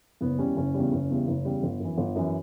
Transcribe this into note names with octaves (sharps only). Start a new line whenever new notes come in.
F#1 B3
E2 C#3 G3 C#4
F#1 C#4
E2 C#3 G3
F#1
E2 C#3 G3
F#1
E2 C#3 G3
G1
F#2 E3
G1
F#2 E3